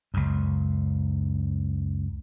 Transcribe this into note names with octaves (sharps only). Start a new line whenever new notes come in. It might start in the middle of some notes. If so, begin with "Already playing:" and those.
C#2 F#2